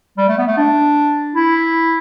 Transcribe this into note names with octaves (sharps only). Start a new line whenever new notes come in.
G3
A3
B3
A3
D4
E4